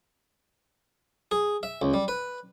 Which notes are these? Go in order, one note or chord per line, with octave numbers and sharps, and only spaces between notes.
G#4
E5
C#2
G3
B4